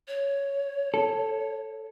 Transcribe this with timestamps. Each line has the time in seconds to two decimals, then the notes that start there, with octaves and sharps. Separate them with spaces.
0.08 C#5
0.94 A4